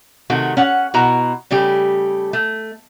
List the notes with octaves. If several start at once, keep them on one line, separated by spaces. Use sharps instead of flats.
C3 D#3 A3 F#4
C#4 F#5
B2 E4 F#4 A#5
C#3 G3 A3 G4
A3